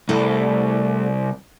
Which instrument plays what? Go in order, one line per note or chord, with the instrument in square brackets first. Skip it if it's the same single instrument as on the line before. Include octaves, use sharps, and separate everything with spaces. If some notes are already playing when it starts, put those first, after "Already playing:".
[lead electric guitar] C2 [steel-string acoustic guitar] A3 E4 D5